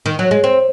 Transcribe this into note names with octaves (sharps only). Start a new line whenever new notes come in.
D#3
F#3
G#3
C4